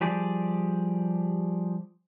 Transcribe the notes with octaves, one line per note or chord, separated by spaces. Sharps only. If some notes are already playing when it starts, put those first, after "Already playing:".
F3 G3 G4 G#4 D5